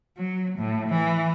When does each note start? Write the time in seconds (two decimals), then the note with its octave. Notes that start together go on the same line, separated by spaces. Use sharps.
0.17 F#3
0.58 A2
0.89 E3